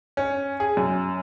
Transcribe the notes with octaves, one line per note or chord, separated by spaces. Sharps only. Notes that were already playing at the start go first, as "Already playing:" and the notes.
C#4
G#4
F#2